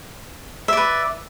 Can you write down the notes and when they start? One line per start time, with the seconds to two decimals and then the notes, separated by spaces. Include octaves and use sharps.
0.68 E5
0.73 D5
0.77 B4